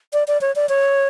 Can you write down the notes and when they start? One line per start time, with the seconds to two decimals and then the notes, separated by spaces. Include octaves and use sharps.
0.13 D5
0.28 D5
0.41 C#5
0.56 D5
0.69 C#5